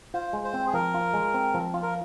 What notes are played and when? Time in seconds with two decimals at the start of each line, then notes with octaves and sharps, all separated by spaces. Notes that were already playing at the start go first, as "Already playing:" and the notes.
0.14 F4 C5
0.33 G#3
0.44 C5
0.54 C4
0.67 G#4
0.74 F3 A#4
0.94 F4
1.14 G#3
1.34 C4
1.54 F3
1.74 F4
1.82 A#4